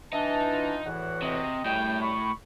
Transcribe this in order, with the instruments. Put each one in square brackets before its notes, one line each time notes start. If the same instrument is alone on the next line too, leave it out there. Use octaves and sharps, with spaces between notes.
[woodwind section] E3 D4 [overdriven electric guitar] D#4 [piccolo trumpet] A5
[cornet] F4
[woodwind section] E2 A2 E3 [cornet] F#4 [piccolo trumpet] F#5
[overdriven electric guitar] C3 [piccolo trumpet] D#5
[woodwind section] F#2 G3 A3 [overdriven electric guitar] A2 [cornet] G5
[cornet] B5 [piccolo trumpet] C#6